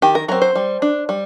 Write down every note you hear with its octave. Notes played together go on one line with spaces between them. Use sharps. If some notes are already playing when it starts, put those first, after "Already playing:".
D#3 G4
A#4
F#3 C4 A#4
C5
G3
D4
G3